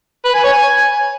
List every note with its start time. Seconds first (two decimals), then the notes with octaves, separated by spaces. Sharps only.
0.25 B4
0.34 G#5
0.44 C#5
0.53 G#5